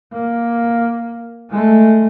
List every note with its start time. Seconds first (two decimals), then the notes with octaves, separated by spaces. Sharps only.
0.13 A#3
1.51 G#3 A3